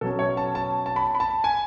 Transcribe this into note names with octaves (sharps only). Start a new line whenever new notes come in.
B2 F#3 C#4 A4
C#5
A5
A5
A5
B5
B5
A5
G#5